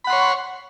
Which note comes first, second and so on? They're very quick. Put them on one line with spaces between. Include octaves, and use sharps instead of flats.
B5 F#5 C6 C#5